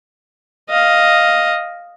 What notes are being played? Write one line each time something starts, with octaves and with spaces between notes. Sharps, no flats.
D#5 F5